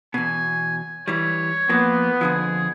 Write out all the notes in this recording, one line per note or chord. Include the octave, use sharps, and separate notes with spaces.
E2 B2 G#5
E3 G3 C#5
F3 A#3 B3
F2 D3 F3 G#4